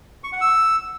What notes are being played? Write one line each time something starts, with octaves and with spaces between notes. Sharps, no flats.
C#6
F#5
E6